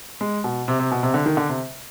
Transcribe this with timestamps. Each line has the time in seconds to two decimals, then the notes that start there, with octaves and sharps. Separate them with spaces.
0.21 G#3
0.44 B2
0.68 C3
0.79 C3
0.91 B2
1.03 C3
1.14 D3
1.26 D#3
1.37 D3
1.49 C3